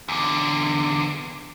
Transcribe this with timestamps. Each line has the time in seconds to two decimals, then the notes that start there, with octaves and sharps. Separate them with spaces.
0.09 E2 D3